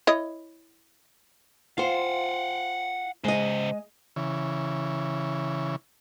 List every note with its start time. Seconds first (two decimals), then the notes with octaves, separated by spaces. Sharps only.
0.07 E4 C#5 D#5
1.78 F4 C5 F5 F#5
3.24 C#3 G#3 C5 D#5
4.16 C#3 E3